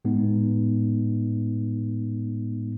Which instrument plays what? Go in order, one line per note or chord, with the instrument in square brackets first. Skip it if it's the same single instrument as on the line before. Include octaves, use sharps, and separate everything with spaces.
[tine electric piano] A2 G#3 B3 D#4